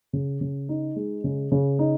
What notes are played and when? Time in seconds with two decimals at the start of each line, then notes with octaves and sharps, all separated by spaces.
0.13 C#3
0.41 C#3
0.69 D#4
0.96 G#3
1.24 C#3
1.52 C#3
1.79 D#4